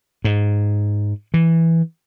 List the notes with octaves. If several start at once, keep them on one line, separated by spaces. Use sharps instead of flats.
G#2
E3